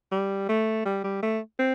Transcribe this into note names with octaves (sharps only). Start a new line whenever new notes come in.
G3
A3
G3
G3
A3
C4